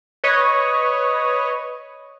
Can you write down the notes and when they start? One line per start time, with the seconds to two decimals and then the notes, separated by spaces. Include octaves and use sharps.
0.24 B4 C#5 D#5